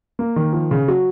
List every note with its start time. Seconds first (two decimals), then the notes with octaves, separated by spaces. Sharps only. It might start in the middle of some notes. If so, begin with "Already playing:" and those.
0.19 A#3
0.36 D#3
0.53 F3
0.71 C#3
0.88 F#3